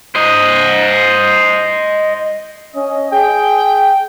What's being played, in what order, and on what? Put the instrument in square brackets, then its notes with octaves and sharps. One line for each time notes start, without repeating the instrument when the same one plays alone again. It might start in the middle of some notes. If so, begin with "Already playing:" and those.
[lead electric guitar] C5 D#5
[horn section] C#4 D#5
G#4 G5